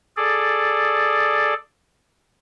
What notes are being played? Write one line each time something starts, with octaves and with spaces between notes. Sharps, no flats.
G#4 A4 D5